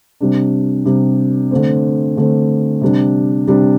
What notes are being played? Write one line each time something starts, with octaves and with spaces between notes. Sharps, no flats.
C3 G3 D4
C3 G3 D4
D3 A3 C4
D3 A3 C4
C3 G3 D4
C3 G3 D4